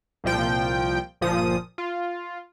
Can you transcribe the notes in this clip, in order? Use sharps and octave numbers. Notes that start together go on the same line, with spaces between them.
C2 A#2 F3 G5
G1 A#2 F3 D#6
F4